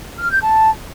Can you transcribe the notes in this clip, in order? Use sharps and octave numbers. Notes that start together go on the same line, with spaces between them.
F6
G6
A5